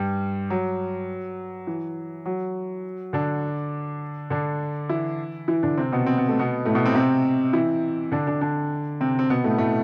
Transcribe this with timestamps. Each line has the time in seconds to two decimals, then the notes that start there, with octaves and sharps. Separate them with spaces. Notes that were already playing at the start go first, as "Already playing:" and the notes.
Already playing: G2 G3
0.50 F#3
1.67 E3
2.26 F#3
3.13 D3 D4
4.30 D3 D4
4.89 E3 E4
5.48 E3 E4
5.63 D3 D4
5.78 C3 C4
5.92 B2 B3
6.06 C4
6.18 B3
6.28 A3
6.39 B2 B3
6.65 A2 A3
6.75 B2 B3
6.85 C3 C4
6.95 C3 C4
7.53 E3 E4
8.12 D3 D4
8.27 D3 D4
8.41 D3 D4
9.01 C3 C4
9.19 C4
9.30 B2 B3
9.44 A2 A3
9.58 A2 A3